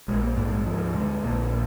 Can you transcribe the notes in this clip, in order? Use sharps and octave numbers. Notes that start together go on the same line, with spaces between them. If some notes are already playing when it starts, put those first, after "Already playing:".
A#1 G#3
A#3
G#2 A#3
G#3
D2 F3
D3 G#3
A#1 A#3